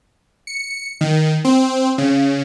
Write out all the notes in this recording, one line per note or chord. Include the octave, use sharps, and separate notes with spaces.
C#7
D#3
C4
C#3